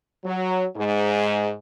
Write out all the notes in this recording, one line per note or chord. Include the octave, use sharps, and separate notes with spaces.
F#3
G#2